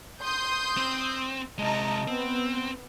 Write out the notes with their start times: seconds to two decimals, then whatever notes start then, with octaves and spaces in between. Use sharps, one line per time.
0.20 C6 D#6 G6
0.77 C4
1.58 C3 G#3 D#5 A5 A#5
2.08 B3 C4